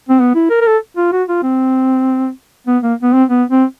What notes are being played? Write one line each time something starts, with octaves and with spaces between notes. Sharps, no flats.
C4
B3
E4
A#4
A#4
A4
F4
F#4
F4
C4
B3
A#3
B3
C4
B3
C4